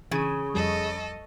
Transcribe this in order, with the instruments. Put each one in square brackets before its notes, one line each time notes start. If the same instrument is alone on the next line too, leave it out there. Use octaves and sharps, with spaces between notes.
[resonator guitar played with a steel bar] C#3 [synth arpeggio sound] E3 D#7 [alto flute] G#4
[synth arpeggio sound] F2 F3 G3 [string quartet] A4 D#5